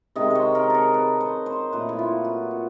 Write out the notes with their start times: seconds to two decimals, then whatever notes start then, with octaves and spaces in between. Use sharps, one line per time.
0.16 C3 D#3 G#3 D#5
0.30 C5 C#5
0.55 A#4
0.70 A4 A#4
0.94 B4
1.21 C5
1.46 C5
1.72 A#2 F#3 A3 B4
1.89 E4
1.99 F4
2.25 F#4
2.51 F4